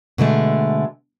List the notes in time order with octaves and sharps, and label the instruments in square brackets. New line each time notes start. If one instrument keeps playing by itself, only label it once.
[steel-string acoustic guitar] B2 D3 G#3 A3